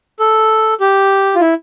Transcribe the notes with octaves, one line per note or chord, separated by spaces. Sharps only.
A4
G4
F4
E4